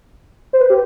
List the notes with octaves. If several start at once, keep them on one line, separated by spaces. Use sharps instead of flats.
C5
B4
G4